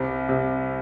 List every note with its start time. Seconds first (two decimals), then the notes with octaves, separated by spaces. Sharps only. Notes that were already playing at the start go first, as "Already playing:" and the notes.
Already playing: C2 C3
0.29 C3